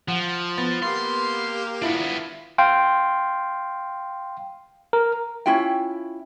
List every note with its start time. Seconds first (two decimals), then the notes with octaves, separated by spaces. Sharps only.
0.08 F3 F#5
0.58 B3 A6
0.82 A#3 G4 F5 C6
1.82 B3 D4 E4 F4
2.58 F5 G5 C6
4.93 A#4
5.46 C#4 E4 F4 G5